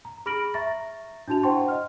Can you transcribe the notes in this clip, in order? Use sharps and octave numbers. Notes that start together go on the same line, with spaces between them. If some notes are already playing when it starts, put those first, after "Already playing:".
A#5
G#4 B5 F6 A#6 D7 F#7
E5 A#5 C#6 A6 A#6
D4 E4 F#4 A5 F7
C5 F#5 G5 A5 C6 C#6
D#5 F6